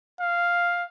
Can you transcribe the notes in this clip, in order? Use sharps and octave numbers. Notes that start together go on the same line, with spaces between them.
F5